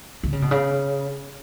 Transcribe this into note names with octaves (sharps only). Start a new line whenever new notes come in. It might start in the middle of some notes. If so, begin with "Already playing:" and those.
D3
C#3
B2
C#3